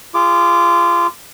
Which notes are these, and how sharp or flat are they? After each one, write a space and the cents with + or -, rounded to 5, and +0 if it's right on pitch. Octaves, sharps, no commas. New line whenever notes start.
F4 -20 G#4 -20 D6 +0